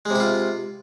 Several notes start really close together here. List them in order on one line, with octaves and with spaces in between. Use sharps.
G#3 C3 E4 F4